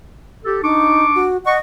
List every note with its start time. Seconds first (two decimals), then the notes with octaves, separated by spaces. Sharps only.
0.45 G4 A4
0.63 D4 D#4 C#6 D6
1.15 F#4
1.45 D#5 F#5 C#6